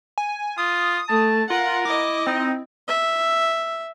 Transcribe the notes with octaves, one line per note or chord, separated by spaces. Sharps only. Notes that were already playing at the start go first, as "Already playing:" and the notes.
G#5
F4 D#6
A3 A5
F4 A#4 F#5
E4 D#5 D6
C4 D#4
E5